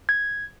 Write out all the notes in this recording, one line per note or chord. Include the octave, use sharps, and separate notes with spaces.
G#6